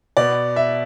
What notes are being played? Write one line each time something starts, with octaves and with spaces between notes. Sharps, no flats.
B2 B3 D5
E5